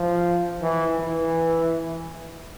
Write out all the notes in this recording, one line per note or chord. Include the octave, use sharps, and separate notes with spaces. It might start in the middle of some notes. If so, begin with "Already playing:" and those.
Already playing: F3
E3
E3